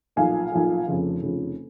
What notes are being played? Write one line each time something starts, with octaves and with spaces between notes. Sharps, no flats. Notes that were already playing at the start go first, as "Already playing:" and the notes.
B1 A#2 F3 F5 G#5
B1 A#2 F3
F1 F2 C#3 F3
F1 F2 C#3 F3